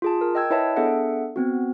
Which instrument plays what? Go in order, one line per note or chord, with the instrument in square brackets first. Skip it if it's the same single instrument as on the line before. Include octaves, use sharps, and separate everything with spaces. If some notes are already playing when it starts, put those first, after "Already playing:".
[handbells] F4 G#4 A5
A#4
D#5 G5 E6 G#6
E4 B4 C#5 D#5 E5 A5
B3 D4 G#4 A4 E5 F#5
B3 C4 F#4